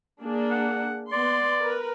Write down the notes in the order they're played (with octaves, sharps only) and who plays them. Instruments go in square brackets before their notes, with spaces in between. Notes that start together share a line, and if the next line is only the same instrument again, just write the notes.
[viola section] A#3 D4 G#4
[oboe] F#5
[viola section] B3 C6 [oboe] D5
[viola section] A#4 B4